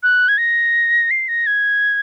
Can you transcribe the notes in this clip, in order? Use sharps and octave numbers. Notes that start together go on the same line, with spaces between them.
F#6
G#6
A#6
C7
A#6
G#6